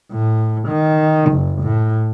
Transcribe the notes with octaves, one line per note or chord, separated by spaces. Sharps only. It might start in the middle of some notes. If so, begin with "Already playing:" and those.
A2
D#3
F#1
A2